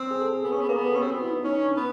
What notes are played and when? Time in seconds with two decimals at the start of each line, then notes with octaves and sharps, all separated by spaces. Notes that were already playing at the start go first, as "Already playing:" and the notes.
Already playing: C4
0.11 G#4
0.22 A4
0.32 G#4
0.44 B3 G#4
0.52 C#4
0.61 B3
0.69 A#3
0.77 B3 G#4
0.86 A4
0.95 C#4
1.02 C4 G4
1.11 B3 F#4
1.22 E4
1.33 D#4
1.44 C#4 D#4
1.55 D#4
1.66 D4
1.77 B3